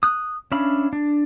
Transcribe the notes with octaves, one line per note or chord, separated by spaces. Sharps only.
D#6 F#6
C#4 D4 E5 F5 B5
D4